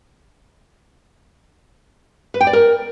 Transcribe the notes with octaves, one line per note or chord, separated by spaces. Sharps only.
B4
G5
D5
A#4